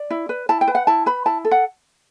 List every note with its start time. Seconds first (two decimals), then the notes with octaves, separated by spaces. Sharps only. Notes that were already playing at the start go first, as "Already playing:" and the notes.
Already playing: D5
0.10 E4
0.29 B4
0.49 E4 A5
0.61 G5
0.68 B4
0.75 F#5
0.87 E4 A5
1.06 B4 B5
1.26 E4 A5
1.45 A4
1.51 F#5